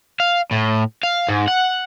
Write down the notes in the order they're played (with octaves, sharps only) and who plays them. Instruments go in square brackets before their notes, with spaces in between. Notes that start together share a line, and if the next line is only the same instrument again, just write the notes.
[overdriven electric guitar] F5
A2
F5
G#2
F#5